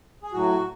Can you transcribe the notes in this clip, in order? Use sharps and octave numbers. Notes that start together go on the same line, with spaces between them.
G#4
A2 F#3 F#4